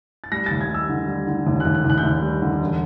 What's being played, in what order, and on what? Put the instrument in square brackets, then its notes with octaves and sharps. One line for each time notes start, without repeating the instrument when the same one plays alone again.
[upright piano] A6
G3 A#6
D#2 A6
G#6
G3 E6
D3
G3
D3
D#2
D#2 F#6
F#6
D#2
F#6
G6
D#2 F#6
G3
D3
E1